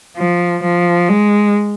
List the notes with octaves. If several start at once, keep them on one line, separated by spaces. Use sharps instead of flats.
F3
F3
G#3